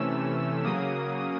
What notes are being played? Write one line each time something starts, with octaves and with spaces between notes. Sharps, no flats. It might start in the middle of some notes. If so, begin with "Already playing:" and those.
Already playing: C3 E3 A3 C#4 E6
C#3 F#3 A#3 D#6